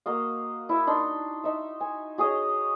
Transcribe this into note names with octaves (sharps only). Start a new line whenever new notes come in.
A#3 F#4 D#5 F5
E4 E5
D4 D#4 B5 C6
D#4 E5
G#5
F#4 G#4 C#5 D#5